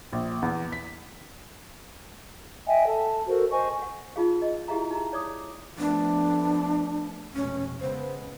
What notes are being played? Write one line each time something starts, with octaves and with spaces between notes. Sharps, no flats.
A#1
E2
B6
D#5 E5 G5 G#5
A4 A5
F#4 A4 A#4 C5
C5 D#5 G#5 C#6
F#5
D#4 F4 G#4 F5
D#5
E4 G4 G#4 E5 F5 A#5
D#4 A#5
C#5 D5 D6 D#6
F3 A3 B3 D4
F1 B2 G#3 C#4
C#3 G#3 B3 C5